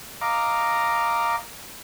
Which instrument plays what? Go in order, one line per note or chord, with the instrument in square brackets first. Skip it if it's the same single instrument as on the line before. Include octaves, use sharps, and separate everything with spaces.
[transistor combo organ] D#5 F5 A#5 D6